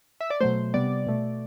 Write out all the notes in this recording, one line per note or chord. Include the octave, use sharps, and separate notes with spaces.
E5
D5
B2 F#3 A3 C5
C3 G3 B3 D5
B2 A3